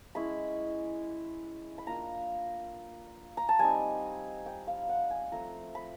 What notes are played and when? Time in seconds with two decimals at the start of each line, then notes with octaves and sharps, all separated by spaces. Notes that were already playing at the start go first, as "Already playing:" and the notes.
0.15 G#3 C#4 E4 B5
1.78 B5
1.87 A#3 D4 F4 A#5
3.37 A#5
3.49 A5
3.59 G3 C4 D#4 G#5
4.46 G5
4.67 F5
4.89 F#5
5.10 G#5
5.32 F3 A3 C4 A#5
5.75 B5